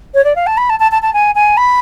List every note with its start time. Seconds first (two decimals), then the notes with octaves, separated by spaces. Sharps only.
0.14 C#5
0.24 D5
0.35 F5
0.46 A5
0.57 B5
0.69 A5
0.79 A5
0.91 A5
1.02 A5
1.13 G#5
1.35 G#5
1.57 B5